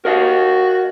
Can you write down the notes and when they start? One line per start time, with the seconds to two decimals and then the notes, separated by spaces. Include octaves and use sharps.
0.05 F#4 A#4 D#5 F5